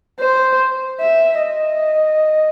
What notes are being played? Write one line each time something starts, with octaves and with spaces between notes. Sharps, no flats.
C5
E5
D#5